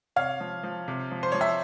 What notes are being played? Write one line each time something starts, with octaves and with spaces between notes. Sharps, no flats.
C3 C#5 F5
F3
F3
C3
F3
C5
F3 C#5
E5